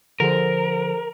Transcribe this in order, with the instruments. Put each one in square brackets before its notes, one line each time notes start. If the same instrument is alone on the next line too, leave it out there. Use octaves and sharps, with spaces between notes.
[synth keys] D3 [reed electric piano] F3 G#4 C5 [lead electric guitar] A#4